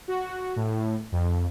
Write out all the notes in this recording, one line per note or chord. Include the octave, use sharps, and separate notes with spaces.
F#4
A2
F2